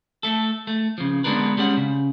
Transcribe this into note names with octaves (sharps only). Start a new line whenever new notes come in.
A3 A4
A3
C#3 F3
D3 G#3 B3 D4 A#4 B4
G3 G#3 C#4 F#5
C#3